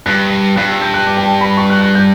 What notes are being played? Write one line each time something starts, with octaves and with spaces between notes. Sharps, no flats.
G2 F#6
G2 F#6
E6
G6
F#6
D6
G5
A5
B5
C#6
F#6
F#6
G6